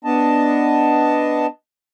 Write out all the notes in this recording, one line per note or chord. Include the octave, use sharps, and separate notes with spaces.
B3 D4 D#5 A5